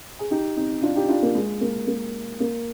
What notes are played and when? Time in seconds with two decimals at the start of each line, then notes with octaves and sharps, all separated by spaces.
0.19 G#4
0.31 D#4 G4
0.57 C4 D#4
0.82 D4 F4
0.96 D#4 G4
1.09 D4 F4
1.22 A#3
1.35 G#3
1.61 A#3
1.87 A#3
2.40 A#3